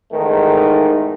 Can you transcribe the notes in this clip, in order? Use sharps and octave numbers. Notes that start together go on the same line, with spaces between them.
E2 G#2 D#3 A3 A#4